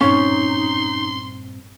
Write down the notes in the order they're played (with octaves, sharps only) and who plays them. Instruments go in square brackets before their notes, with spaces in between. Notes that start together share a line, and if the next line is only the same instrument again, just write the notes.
[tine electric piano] G2 A#2 C4 [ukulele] C#4 [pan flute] D#4 [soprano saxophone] C6